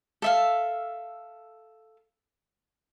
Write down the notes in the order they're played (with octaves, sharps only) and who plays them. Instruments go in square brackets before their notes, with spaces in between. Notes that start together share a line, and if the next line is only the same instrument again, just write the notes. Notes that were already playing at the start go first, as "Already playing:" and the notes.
[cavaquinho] A4 E5 F5